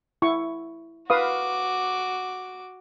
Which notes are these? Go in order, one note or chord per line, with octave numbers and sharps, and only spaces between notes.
E4 C#6
F#4 B4 F5 D6 D#6